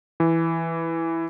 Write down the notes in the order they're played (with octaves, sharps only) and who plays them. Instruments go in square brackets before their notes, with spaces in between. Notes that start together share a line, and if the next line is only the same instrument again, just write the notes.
[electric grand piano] E3